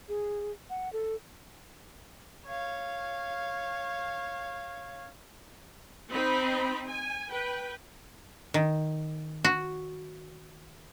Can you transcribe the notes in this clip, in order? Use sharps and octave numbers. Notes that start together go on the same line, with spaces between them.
G#4
F#5
A4
C#5 F5
C4 D#4 B5
G#5
B4 G5
D#3
F#4